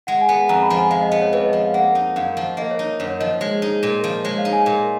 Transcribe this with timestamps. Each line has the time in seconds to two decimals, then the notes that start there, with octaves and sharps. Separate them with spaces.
0.07 G#3 F#5
0.21 G#5
0.29 B3
0.36 F#5
0.49 F2 A#5
0.63 B5
0.70 F3
0.77 G#5
0.91 G#3 F5
1.01 D#5
1.12 B3 D#5
1.22 C#5
1.33 F2 B4
1.46 D#5
1.53 F3
1.61 F5
1.74 A#3 F#5
1.95 D#4
2.16 F#2 F5
2.37 F3
2.57 A#3 D#5
2.71 C#5
2.79 D#4
3.00 F#2 C#5
3.10 C#5
3.20 F3 D#5
3.30 C#5
3.41 G#3
3.62 D#4
3.83 A#2
4.04 F3
4.25 G#3 C#5
4.38 F5
4.45 D#4
4.52 G#5
4.66 A#2